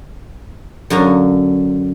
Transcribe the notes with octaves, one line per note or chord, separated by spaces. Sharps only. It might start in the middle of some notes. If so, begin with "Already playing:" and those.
F#2 D3 F5 A#5